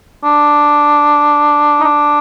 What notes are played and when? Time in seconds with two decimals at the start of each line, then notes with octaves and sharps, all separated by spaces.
0.24 D4
1.81 D#4
1.84 D4